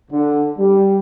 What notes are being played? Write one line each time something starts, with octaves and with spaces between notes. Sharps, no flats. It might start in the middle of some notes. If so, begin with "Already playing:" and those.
D3
G3